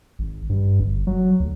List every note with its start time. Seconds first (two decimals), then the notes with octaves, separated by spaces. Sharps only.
0.19 G#1
0.50 G2
0.80 G1
1.07 F#3
1.40 D2